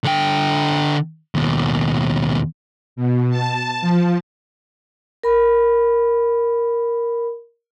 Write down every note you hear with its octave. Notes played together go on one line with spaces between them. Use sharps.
D3 G5
D#2 B2
B2
A5
F3
A#4 B5